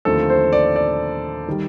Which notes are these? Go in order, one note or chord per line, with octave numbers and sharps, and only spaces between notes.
D#2 D3 F3 A3 C4 A4
C5
D5
D5
D#3 G3